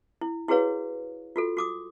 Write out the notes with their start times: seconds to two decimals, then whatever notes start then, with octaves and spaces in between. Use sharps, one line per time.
0.21 E4
0.48 E4 F#4 G#4 B4 C#5 F5
1.36 F4 F#4 A4
1.57 F#4 D6 D#6